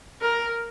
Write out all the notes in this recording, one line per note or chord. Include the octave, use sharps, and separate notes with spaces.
A#4